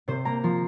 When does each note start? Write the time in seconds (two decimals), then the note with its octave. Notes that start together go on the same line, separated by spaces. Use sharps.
0.08 C3 C5
0.25 A#3 A#5
0.44 F3 C6